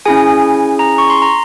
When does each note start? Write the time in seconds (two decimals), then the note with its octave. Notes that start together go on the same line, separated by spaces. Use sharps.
0.06 C#4 E4 G#4 G#5
0.79 A#5
0.98 C#6
1.10 C6
1.22 A#5